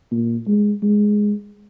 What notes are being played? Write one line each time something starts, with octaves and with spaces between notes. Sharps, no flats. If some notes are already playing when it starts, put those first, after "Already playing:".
A#2
G#3
G#3